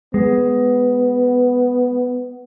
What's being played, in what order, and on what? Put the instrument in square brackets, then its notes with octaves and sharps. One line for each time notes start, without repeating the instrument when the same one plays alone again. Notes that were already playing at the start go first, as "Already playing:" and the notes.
[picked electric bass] G#3 [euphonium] B3